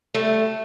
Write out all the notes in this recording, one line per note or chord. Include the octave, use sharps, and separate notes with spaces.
G3 A3